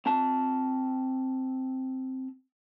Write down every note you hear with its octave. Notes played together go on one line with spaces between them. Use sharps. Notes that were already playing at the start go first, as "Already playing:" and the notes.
C4 A5